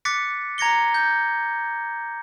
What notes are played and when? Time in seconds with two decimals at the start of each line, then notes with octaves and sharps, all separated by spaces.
0.05 D6 F#6 A6 B6 C#7
0.58 A#5 G#6 A#6 C#7 G7
0.94 G6